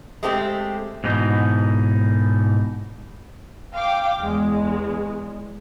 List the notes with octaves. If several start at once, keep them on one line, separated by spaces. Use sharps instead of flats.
G#3 A3 C4 G4
G#2 B2 E3 D#4
F5 G5 D6
E2 G#3